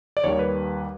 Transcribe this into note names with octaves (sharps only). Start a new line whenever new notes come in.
D5
D#2 D#3 G3 C#5
B4